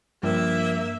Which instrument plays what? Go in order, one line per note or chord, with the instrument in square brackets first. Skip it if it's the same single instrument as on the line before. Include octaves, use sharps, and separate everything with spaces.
[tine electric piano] G2 F3 [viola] A#3 E5